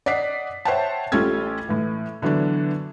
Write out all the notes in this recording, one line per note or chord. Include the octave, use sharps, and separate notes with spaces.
D5 D#5 F#5 B6 C7
C5 C#5 E5 F#5 G5 A5
A1 C#4 F4 G4 A4 G#6
A2 E3
D3 E3 F#3 B3 D4